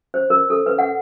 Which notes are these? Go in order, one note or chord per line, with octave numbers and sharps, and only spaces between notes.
C5
A#4
A4
B4
F#5